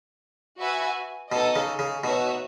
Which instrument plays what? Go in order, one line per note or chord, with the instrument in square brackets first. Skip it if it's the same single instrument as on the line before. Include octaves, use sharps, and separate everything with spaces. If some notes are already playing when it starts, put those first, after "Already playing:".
[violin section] F#4 B4 E5 G#5
[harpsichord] B2 [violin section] D#4 A4 D#5
[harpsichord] C#3
C#3
[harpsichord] B2 [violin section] D#4 F#4 C#5 E5